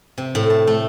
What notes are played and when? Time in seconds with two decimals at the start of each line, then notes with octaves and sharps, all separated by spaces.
0.18 C3
0.35 A2
0.50 A5
0.67 A3